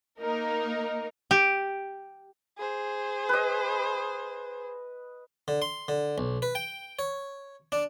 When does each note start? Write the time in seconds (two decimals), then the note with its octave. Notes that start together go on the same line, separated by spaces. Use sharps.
0.20 A#3 D#4 A#4
1.31 G4
2.58 G#4 C5
3.29 B4 D#5
5.48 D3
5.62 C6
5.88 D3
6.18 B1
6.42 B4
6.55 G5
6.99 C#5
7.72 D4